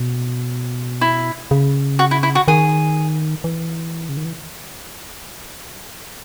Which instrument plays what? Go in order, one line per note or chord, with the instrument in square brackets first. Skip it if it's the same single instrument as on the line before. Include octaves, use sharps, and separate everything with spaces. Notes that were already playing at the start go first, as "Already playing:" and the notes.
Already playing: [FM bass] B2
[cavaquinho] E4
[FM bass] C#3
[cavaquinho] F#4
E4
E4
F#4
[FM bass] D#3 [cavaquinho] G#4
[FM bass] E3
C#3
D#3
E3